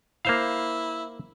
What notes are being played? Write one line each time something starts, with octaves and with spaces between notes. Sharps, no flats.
A#3 E4 C5 F5